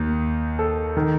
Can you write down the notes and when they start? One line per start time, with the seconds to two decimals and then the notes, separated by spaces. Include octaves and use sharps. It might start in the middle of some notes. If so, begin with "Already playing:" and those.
Already playing: D#2 D#3
0.59 A4
0.97 D#3